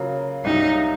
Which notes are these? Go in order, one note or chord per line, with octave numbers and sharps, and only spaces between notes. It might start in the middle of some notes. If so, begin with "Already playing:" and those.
Already playing: C#3 F#3 A#3 F4
C2 A#2 F#3 D#4